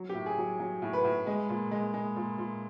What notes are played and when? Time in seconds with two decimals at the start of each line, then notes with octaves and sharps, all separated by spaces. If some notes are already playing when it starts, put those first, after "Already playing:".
Already playing: F#3
0.09 G4
0.15 A2
0.26 G#4
0.38 F#3
0.60 F#3
0.82 A2
0.93 B4
1.04 A2
1.27 G#3
1.49 A#2
1.71 G#3
1.94 G#3
2.16 A#2
2.38 A#2